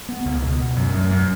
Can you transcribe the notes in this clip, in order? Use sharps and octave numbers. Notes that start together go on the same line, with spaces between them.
B3
C#2
B2
B2
F#2
F#2
F#2